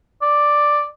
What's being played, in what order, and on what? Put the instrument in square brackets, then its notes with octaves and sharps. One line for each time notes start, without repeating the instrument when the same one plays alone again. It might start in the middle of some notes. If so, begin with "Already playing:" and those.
[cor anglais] D5